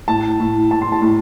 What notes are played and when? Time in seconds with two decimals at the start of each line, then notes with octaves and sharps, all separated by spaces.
0.08 A2 A5
0.40 A2
0.71 A2 A5
0.82 C6
0.92 A5
1.02 A2